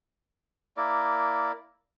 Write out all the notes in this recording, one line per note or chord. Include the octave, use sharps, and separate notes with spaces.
A#3 E4 A#4 D5